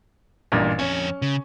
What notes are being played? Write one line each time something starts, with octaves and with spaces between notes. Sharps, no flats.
A1 G2 A#2
F2 C#4 C#5
C#3